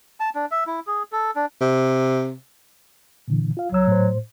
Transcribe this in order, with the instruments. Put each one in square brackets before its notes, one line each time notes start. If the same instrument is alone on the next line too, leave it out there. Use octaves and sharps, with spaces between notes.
[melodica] A5
D4
E5
E4
G#4
A4
D4
[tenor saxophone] C3
[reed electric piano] A#2 D3 E3
F4 F5
[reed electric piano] C#2 E6 [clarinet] F#3
[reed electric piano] A2 C5